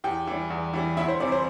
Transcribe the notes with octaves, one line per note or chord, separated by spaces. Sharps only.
E2 G4 G5
E3 G3
E2
E3 G3
D2 E4 E5
C5
C3 E3 G3 D5
C5